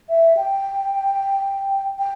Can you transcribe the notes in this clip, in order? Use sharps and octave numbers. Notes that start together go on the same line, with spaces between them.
E5
G5
G5